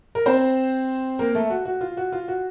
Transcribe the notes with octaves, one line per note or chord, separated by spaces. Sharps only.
A#4
C4 C5
A#3 A#4
A3 A4
F#4
F#4
F4
F#4
F4
F#4